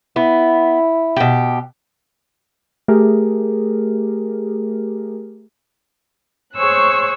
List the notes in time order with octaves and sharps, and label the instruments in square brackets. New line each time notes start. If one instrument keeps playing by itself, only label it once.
[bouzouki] B3 [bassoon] E4
[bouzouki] B2 G4
[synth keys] A3 G4 G#4 A#4
[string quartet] G#4 C5 C#5 C#6 E6 F#6